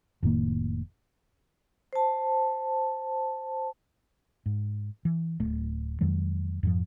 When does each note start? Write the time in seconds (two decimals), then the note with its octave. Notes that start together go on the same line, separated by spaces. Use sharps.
0.23 F1 A2 D#3 A#3
1.93 C5 A5
4.46 G#2
5.05 E3
5.40 D1 A3
6.01 F2 D#3 F#3 G#3
6.63 F2 G#2 F3